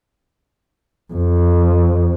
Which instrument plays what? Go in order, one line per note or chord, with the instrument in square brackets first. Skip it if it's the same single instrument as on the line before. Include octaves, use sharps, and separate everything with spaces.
[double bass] F2